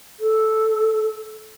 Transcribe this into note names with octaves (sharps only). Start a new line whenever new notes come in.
A4